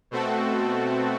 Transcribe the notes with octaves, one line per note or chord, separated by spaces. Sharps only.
B2 A3 C4 F#4 A4